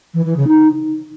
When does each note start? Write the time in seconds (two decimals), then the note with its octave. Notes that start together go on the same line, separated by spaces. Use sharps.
0.14 E3
0.25 E3
0.36 C#3
0.47 D#4